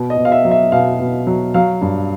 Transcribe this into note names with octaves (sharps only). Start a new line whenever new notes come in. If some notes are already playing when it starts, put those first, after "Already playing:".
Already playing: B2
D#5
B2
F5
E5
F#3
E5
B2 F5
B2
F#3
F#3 F5
G2